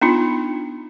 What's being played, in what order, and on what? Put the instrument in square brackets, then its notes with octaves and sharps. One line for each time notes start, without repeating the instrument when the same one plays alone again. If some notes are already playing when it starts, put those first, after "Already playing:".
[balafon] B3 D4 D#4 F4